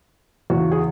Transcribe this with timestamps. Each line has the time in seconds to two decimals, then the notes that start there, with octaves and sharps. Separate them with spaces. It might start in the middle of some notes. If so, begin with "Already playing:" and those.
0.50 E2 C#3 E3 F#4
0.71 G#4